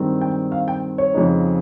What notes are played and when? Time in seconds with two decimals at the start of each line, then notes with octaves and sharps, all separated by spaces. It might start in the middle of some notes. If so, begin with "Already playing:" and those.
Already playing: G2 D#3 G#3 C4
0.21 G5
0.52 F5
0.68 G5
0.98 C#5
1.14 F2 C#3 G#3 D#4